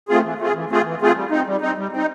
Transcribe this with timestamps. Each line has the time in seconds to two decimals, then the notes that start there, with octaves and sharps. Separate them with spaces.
0.09 A3 C4 F4 G#4
0.24 E3
0.39 A3 C4 F4 G#4
0.55 E3
0.70 A3 C4 F4 G#4
0.85 E3
1.01 A3 C4 F4 G#4
1.16 G3
1.31 C4 D#4
1.47 G3
1.61 C4 D#4
1.77 G3
1.92 C4 D#4